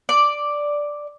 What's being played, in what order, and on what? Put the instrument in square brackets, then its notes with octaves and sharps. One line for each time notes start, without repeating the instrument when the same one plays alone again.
[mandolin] D5